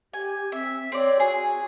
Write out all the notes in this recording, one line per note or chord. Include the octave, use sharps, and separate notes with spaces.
G4 G#5
C4 E5
C4 C#5 D5
F#4 G#4